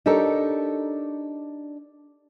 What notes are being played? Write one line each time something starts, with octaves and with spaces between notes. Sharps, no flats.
D4 D#4 G4 A4 A#4 C#5